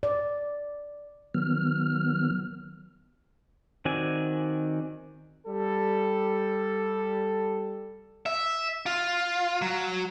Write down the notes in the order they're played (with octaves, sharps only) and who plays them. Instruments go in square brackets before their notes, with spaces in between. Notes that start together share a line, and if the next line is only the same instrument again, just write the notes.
[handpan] D5
[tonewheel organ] D#3 F#3 B3 F6
[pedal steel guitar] D#3 C4 F#4 D5 G#5
[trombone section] G3 A4
[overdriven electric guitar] E5
F4
F#3